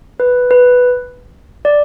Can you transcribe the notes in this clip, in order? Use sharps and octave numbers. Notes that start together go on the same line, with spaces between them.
B4
B4
D5